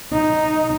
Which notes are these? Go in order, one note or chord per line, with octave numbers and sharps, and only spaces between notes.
D#4